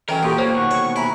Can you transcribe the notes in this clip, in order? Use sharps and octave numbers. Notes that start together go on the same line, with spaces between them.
E3 F#3 C#4 A4 A#4 D#5 G5
A#2 F#4 G4 A4 C6 C#6
A#3 C5 C#5
D#2 B2 F#5 C#6 F#6
C#5
E4 G#5 A#5 B5